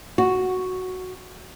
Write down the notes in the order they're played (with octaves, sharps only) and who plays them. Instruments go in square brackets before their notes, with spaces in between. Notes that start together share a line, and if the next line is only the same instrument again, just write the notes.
[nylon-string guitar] F#4